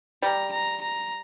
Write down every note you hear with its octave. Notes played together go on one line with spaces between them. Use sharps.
G3 A#5
A#5
A#5